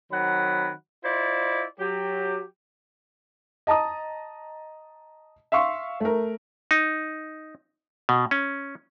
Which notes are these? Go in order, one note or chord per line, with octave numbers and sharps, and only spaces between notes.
D#3 F#3 C4 F#5 B5
E4 F4 C5 D5 D#5
F#3 G4
D#5 A5 A#5 D#6
E5 F5 C6 C#6
A3 A#4
D#4
B2
C#4